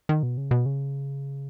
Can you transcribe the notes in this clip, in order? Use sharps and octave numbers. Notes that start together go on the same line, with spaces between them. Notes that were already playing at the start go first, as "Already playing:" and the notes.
D#3
B2
C#3
B2
C#3